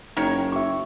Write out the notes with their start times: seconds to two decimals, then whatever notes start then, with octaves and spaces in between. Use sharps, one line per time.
0.17 F#1 D#3 D#4 A#4 C#5
0.52 F#4 E5 C#6